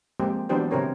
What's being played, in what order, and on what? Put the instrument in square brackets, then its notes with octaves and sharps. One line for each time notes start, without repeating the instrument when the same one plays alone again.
[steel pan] F3 G#3 A#3 C4 G4
E3 F#3 B3 D4 G4 C5
C#3 C4 G4 A#4 C#5